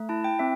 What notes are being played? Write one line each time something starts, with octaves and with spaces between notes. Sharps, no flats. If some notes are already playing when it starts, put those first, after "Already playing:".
Already playing: A3
E4 A5
G5
C4 E5